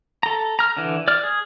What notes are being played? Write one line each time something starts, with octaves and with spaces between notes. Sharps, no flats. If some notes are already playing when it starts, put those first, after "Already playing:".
A4 A#5
A#5 F6
D3 E3
D5 F6
G#4